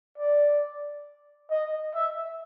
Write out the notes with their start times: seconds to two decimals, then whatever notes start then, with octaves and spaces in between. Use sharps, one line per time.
0.18 D5
1.51 D#5
1.95 E5